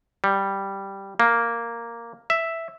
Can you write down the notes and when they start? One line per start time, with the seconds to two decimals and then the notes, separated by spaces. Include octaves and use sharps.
0.24 G3
1.20 A#3
2.30 E5